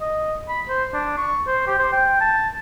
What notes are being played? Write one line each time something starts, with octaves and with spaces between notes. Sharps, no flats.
D#5
B5
C5
D4
C#6
C5
G4
C5
G5
A5